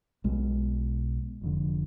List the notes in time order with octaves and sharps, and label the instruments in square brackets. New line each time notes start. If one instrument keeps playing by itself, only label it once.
[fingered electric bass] B1 B2 G#3
F1 F2 D3